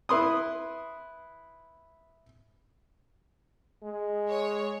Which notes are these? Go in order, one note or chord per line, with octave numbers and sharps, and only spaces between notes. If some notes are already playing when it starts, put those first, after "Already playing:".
E4 B4 C6 D#6
G#3
C#5